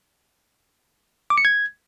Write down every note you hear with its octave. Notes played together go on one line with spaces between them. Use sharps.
D6
C#7
G#6